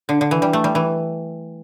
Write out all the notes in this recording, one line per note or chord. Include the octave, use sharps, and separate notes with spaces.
D3
D3
E3
G3
A3
G3
E3